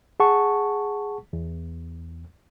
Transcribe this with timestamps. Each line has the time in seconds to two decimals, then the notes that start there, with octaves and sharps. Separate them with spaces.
0.20 G#4 F#5 A5 C#6
1.33 E2